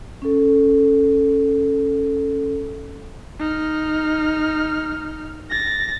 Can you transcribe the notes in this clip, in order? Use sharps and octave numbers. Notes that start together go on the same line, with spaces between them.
C#4 A4
D#4 F6
A6 A#6